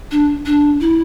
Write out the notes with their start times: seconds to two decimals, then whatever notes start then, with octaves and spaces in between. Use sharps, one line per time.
0.11 D4
0.46 D4
0.80 E4